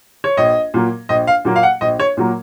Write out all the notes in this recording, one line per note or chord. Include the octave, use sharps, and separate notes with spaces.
C#5
A#1 D#5
A#2 F#3 A#3
A#1 D#5
F5
A#2 F#3 A#3
F5
F#5
A#1 D#5
C#5
A#2 F#3 A#3